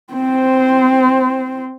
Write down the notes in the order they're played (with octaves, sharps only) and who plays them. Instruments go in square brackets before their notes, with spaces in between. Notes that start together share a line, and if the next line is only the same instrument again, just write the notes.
[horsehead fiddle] C4 C5